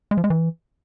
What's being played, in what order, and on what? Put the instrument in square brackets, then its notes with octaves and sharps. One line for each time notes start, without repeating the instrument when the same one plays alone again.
[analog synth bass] G#3
F3
G#3
E3